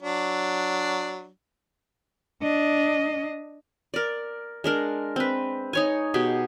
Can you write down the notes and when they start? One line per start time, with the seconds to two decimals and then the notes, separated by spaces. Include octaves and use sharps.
0.03 F#3 D4
2.42 D4 D#5
3.94 A#4 D5
4.64 G#3 D4 A#4
5.16 C4 B4
5.73 D#4 C#5 G#5
6.14 B2 G4 G#4